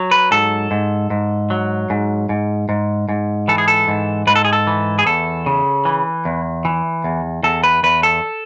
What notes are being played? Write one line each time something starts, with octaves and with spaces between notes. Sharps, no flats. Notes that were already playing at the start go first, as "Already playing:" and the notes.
Already playing: F#3
B4
G#2 A4
G#2
G#2
F#3
G#2
G#2
G#2
G#2
E3 A4
G#4
A4
G#2
G#2 B4
A4
G#4
A4
E3
G#4
E2 A4
C#3
E3
E2
E3
E2
E2 A4
B4
E2 B4
A4